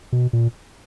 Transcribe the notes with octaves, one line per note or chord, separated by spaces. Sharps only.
B2
A#2